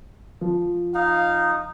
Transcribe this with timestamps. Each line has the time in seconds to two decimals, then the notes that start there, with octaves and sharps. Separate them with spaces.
0.41 F3
0.95 D#4 F5